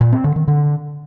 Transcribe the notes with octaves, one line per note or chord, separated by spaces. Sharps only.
A#2
C4
D3
D#3
D3